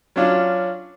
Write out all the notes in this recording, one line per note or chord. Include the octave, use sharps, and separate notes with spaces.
F#3 C#4 D4 F4